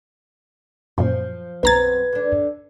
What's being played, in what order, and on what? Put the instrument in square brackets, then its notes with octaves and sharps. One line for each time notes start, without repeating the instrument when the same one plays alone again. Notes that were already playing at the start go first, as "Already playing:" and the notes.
[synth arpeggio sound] F#2 A#2 [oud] F3
[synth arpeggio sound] B1 A#5 A6 [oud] F#2 C4 [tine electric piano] B4 G#6
[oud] D3 D4